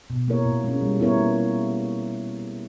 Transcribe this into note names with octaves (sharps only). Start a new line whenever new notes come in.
B2
A#3 E4 A#4 C#5
A#2
G#3 C#4
G3
B3 E4 A#4 C#5
A#3